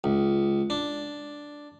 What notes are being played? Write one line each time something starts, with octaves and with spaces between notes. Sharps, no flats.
C#2
D4